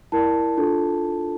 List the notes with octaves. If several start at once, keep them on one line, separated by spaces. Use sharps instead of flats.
E4 A#4 D5 A5
D4 F4 A4